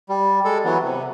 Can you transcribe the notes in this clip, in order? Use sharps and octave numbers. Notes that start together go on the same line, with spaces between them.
G3
G#3 A4
E3 F#3 B3
C3